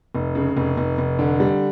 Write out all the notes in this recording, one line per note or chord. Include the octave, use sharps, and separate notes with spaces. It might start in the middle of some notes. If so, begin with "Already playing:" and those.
F1
C#3
F1
F1
F1
D3
G3